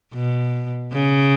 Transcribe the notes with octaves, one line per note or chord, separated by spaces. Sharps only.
B2
C#3